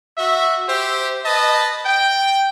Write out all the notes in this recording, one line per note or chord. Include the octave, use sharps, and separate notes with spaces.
F#4 E5
G4 C5 E5
B4 D#5 A5
G5